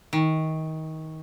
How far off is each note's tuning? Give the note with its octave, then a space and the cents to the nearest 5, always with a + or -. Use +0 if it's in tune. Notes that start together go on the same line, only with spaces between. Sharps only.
D#3 +25